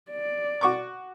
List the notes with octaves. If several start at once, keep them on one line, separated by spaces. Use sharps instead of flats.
D5
F#4 C#6 D6